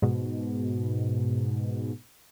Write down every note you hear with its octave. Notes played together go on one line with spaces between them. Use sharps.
G#2 B2